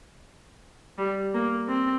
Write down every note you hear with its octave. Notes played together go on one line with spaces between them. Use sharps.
G3
A#3
C4